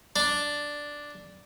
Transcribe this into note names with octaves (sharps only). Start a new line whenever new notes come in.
D4